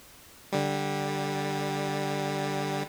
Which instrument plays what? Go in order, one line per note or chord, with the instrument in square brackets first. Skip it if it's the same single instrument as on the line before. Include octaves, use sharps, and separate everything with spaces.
[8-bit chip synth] D3 G3